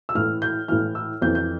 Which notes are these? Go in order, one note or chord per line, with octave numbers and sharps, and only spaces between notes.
E6
A2 E3 F6
G6
A2 E3 F6
E6
F2 E3 G6
G6